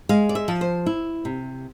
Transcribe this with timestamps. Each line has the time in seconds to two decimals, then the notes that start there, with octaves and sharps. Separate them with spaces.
0.09 G#3 F5
0.29 D5
0.35 E5
0.48 F3
0.61 C5
0.86 E4
1.25 C3